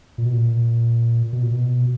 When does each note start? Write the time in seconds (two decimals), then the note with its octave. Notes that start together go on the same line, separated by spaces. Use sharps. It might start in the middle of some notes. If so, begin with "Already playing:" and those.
0.18 A#2
0.26 B2
0.33 A#2
1.33 B2
1.43 A#2
1.52 B2